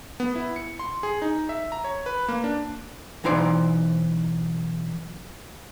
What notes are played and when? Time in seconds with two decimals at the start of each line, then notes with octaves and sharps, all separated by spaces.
0.20 B3
0.35 E4
0.56 C#7
0.79 C6
1.03 G#4
1.22 D#4
1.49 E5
1.72 A#5
1.84 C#5
2.06 B4
2.28 A#3
2.44 D4
3.24 B1 E3 D#4 C5 D5